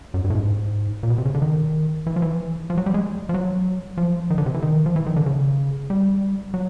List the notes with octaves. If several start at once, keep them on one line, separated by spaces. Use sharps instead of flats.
F#2
G2
A2
G#2
A#2
B2
C3
C#3
D3
D#3
E3
F3
E3
F3
F#3
G3
G#3
F3
F#3
F3
D#3
D3
C3
E3
D#3
F3
E3
D#3
D3
C#3
G3
F#3